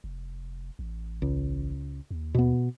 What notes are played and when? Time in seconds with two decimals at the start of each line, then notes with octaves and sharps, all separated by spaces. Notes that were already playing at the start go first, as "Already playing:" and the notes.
0.04 F1
0.79 A1
1.22 C#2
2.11 D#2
2.35 B2 B3